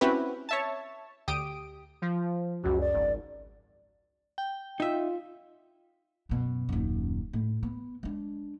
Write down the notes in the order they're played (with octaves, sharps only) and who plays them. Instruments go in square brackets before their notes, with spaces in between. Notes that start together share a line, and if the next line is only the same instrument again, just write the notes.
[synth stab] C4 C#4 E4 F#4 G4 B4
C#5 E5 A5
D2 G4 D#6 D7
[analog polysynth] F3
[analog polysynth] C#2 F#2 [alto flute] F#4
[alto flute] D5
[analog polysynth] G#1
[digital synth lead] G5
[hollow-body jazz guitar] D#4 E5 [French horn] F4
[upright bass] F#2 B2
D#1 F#2
A2
B3
G#3 D4